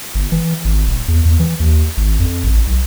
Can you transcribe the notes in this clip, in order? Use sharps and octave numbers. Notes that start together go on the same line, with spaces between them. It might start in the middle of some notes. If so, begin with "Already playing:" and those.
G1
E3
G#1
D#1
E2
E2
E3
D#2
G#1
F2
A1
B1